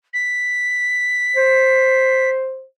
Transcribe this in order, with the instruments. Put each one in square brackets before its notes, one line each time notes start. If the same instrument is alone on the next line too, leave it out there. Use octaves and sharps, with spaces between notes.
[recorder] B6
[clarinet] C5